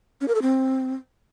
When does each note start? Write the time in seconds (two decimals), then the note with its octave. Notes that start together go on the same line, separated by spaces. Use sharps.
0.21 C#4
0.28 A#4
0.35 A4
0.42 C4